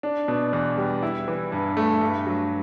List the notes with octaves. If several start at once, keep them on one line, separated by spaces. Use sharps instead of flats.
D4
B2
E2
G3
E4
E3
G2
A3
G2
F#3